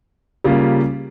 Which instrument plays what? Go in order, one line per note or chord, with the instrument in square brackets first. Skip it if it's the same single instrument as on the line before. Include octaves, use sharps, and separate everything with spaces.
[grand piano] C#3 G3 A#3 F4